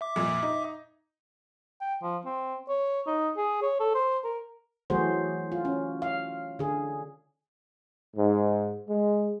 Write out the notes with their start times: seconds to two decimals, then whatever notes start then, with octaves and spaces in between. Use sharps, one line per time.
0.01 E5 D6
0.16 F2 A#2
0.42 D#4
1.81 G5
2.02 F3
2.26 C4
2.69 C#5
3.07 D#4
3.37 G#4
3.62 C#5
3.80 A4
3.94 C5
4.24 A#4
4.90 E3 F#3 A3 F#4 G#4 C5
5.52 F4
5.65 C#4
6.02 F5
6.59 D3 G#4
8.16 G#2
8.89 G#3